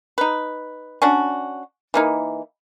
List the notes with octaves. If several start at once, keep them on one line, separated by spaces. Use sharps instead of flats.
D#4 B4
C#4 D4 F#4
E3 A#3 D#4